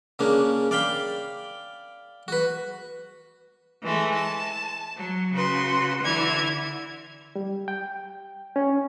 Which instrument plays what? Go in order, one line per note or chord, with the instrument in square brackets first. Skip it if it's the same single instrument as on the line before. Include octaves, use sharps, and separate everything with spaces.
[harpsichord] C#3 A#3 C#4 D4
D5 F5 G5 B5
F#4 B4
[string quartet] E3 G#3 A3
A5
F#3
C#3 F#4 B4 C6
D3 E3 E4 F6 G#6
[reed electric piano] G3
G5
C#4